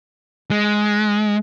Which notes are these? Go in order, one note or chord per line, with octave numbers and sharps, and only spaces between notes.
G#3